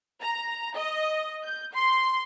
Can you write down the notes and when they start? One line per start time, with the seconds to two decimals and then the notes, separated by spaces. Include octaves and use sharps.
0.21 A#5
0.77 D#5
1.44 G6
1.75 C6